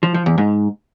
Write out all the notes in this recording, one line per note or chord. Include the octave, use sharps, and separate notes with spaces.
F3
F3
E2
G#2